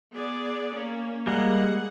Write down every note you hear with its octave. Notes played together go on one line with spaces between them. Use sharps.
B3 G#4 D5
A#3 C#4
G3 G#3 A#3 G#4 F#5